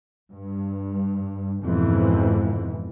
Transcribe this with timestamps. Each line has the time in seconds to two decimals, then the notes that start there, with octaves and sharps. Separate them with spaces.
0.31 G2
1.63 F2 G#2 B2 E3 F3